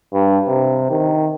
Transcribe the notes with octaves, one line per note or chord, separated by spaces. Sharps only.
G2
C3
D#3